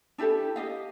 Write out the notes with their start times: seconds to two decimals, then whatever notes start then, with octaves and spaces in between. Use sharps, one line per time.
0.18 D4 E4 G4 A4
0.56 G4 D#5 F5